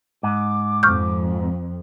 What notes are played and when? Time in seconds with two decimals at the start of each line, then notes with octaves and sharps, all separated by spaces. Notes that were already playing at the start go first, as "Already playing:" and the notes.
0.23 G#2 D6
0.83 F2 C#6 F6 G6